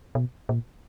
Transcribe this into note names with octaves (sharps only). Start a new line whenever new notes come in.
B2
A#2